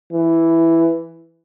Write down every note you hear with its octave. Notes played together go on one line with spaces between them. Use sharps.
E3